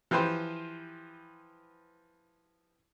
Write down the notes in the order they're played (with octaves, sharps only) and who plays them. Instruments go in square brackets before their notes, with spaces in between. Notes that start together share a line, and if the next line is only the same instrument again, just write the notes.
[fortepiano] E3 F3 G4 B4 C5